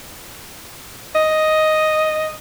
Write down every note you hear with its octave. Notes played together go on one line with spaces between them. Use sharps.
D#5